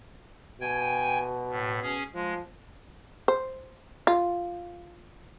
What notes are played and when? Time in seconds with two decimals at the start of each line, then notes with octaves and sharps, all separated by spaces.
0.61 B2 G5 G#5 G#6
1.50 A2
1.82 C#4 G#4
2.15 F3 G#3
3.28 C5
4.07 F4